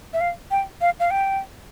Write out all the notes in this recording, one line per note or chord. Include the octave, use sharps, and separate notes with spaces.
E5
F5
G5
F5
F5
G5